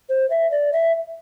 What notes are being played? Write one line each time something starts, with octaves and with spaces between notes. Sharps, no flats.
C5
E5
D5
E5